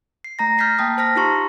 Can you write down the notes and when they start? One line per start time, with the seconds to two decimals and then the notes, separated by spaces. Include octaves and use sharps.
0.24 C7
0.39 A3 A#5 A#6
0.58 F6 G6 A6 B6 C7
0.79 A#3 G5 A5 D#6
0.98 C5 A5 F6 A#6 B6
1.15 D#4 F4 G4 A#5 C6 C#6